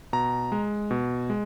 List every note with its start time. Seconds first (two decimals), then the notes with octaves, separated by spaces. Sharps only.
0.13 B2 A#5
0.52 G#3
0.91 B2
1.30 G#3